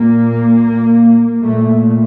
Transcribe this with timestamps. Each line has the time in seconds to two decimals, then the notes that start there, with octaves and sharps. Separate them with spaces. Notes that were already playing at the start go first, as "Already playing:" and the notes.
Already playing: A#2 A#3
1.42 A#2 A3